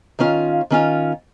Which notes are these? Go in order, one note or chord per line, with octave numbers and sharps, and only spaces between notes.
D#3 C#4 F4 F5
D#3 C#4 F4